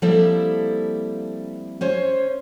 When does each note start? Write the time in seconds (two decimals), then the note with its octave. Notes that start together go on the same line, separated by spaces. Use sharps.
0.02 F3 G3 A#3 C4 E4 A4
1.81 C#4 C5 C#5